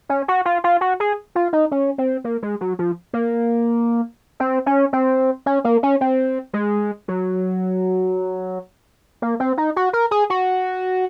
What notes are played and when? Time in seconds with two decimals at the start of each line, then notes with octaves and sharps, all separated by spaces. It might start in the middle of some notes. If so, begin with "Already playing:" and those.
0.09 C#4
0.28 F#4
0.45 F4
0.64 F4
0.81 F#4
1.00 G#4
1.35 F4
1.53 D#4
1.71 C#4
1.98 C4
2.24 A#3
2.42 G#3
2.61 F#3
2.79 F3
3.13 A#3
4.40 C4
4.66 C#4
4.93 C4
5.46 C#4
5.64 A#3
5.83 C#4
6.01 C4
6.53 G#3
7.08 F#3
9.22 A#3
9.40 C4
9.58 D#4
9.76 F#4
9.93 A#4
10.11 G#4
10.30 F#4